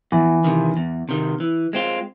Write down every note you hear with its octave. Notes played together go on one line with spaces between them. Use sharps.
E2 E3
C3 D#3
E2
C3 D#3
E3
G#3 C4 F4